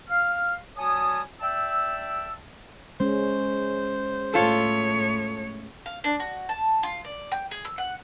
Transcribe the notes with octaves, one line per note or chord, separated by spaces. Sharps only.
F5 F6
G3 F#4 C#5 G#5 A5 D#6
D5 E5 G5 A5 E6
G#3 C#4 C5
A2 F4 A4 C#5
F5
D4
F#4
A5
F4
D5
G5
G#4
E6
F#5